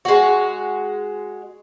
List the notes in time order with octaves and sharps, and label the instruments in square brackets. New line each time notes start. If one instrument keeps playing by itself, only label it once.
[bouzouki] G#3 F#4